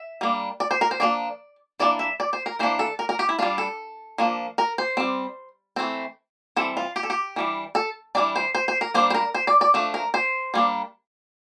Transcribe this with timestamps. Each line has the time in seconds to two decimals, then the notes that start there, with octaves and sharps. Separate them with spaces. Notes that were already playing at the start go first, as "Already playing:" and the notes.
Already playing: E5
0.21 G3 A#3 D4
0.60 D5
0.71 C5
0.81 A#4
0.91 C5
1.00 F3 A#3 D4 D5
1.80 E3 A#3 D4 D5
1.99 E5
2.20 D5
2.33 C5
2.46 A#4
2.59 E3 A#3 D4 C5
2.79 A4
2.99 A#4
3.09 A#4
3.19 G4
3.29 E4
3.39 G3 D4 F4
3.58 A4
4.18 F3 A#3 D4
4.58 A#4
4.78 C5
4.97 G3 C4
5.76 E3 A3 C4
6.56 E3 G3 C4 A4
6.77 F4
6.96 G4
7.03 A4
7.10 G4
7.36 E3 G3 D4
7.75 A4
8.15 E3 G3 D4 D5
8.36 C5
8.55 C5
8.68 C5
8.81 A#4
8.94 G3 A#3 D4 C5
9.10 C5
9.14 A#4
9.34 C5
9.47 D5
9.61 D5
9.74 F3 A3 D4
9.94 A#4
10.14 C5
10.54 G3 A#3 D4